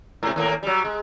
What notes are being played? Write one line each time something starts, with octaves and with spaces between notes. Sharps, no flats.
G#2 C3
D#2 A2 A#3
F#3 G3
G#3